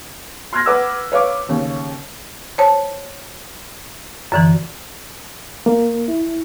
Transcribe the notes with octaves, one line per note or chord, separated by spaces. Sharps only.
C6 F6 F#6 G#6 A#6
B4 F#5 D6 E6
B4 C#5 F5 D6
D#2 C#3
C5 C#5 A5
F#2 D3 E3
A#3
E4